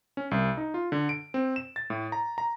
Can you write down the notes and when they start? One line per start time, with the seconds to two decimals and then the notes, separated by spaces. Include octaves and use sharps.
0.17 C#4
0.31 C2
0.57 D#4
0.74 F4
0.92 D3
1.09 D7
1.34 C4
1.56 E7
1.76 A6
1.90 A2
2.12 A#5
2.38 A#5